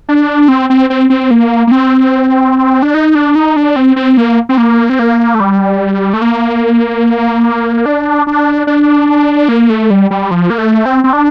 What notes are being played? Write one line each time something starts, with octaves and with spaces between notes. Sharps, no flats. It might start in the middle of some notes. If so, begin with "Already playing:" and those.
D4
C4
C4
C4
C4
A#3
A#3
C4
D4
D#4
D4
D#4
D4
C4
C4
A#3
C4
A#3
C4
A#3
A3
G3
A3
A#3
D4
D4
D4
A#3
A3
G3
G3
F3
A#3
A3
C4
C4
D4